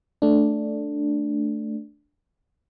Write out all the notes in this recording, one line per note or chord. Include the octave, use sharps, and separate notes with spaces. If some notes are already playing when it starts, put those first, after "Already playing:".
A3 D4